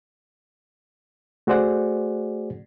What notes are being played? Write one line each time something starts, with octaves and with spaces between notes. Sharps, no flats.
A3 F#4 G#4 C5 D5 F#5